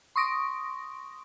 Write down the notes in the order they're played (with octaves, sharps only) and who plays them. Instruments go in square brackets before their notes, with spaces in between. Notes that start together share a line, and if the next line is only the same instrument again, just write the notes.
[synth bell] C6 C#6 D#6 A#6 D7